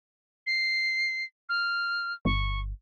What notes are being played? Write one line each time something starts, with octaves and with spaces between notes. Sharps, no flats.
C7
F6
G1 C#6